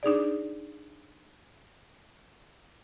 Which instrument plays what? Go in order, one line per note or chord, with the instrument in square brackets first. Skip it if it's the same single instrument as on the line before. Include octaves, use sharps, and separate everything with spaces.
[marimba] D4 D#4 G#4 D5